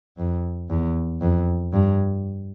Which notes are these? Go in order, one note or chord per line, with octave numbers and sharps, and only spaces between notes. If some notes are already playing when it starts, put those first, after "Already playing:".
F2
E2
F2
G2